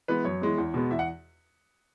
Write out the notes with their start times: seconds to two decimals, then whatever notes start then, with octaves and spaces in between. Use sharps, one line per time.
0.08 E3 G#3 B3 B4
0.25 F#2 C#5
0.41 E3 G#3 B3
0.58 E2
0.74 B2 G#3 B3
0.91 E2 E5
0.99 F#5